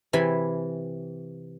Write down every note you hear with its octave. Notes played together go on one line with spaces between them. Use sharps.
C3 E3 E5 G#5 B5